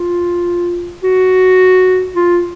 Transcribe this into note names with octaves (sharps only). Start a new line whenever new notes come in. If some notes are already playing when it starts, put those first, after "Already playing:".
Already playing: F4
F#4
F4